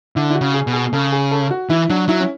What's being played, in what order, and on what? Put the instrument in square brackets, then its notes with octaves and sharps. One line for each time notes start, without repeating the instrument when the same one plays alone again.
[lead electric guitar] D3 [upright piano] E4
[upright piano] E4
F#4
[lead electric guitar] C#3
[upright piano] G#4
[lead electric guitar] B2
[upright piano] G#4
[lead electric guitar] C#3 [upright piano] A4
[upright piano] G#4
A4
F#4
[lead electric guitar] E3 [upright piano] E4
[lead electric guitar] F#3 [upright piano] D4
[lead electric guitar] F#3 [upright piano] E4
[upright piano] C#4